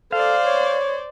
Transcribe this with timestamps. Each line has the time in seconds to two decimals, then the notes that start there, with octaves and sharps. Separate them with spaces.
0.12 A4 C5 D5 F5
0.46 C#5